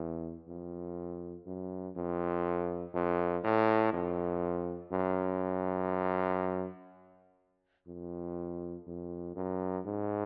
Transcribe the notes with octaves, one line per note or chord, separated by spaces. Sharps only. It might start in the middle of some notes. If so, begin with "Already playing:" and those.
Already playing: E2
F2
F#2
F2
F2
A2
F2
F#2
F2
F2
F#2
G#2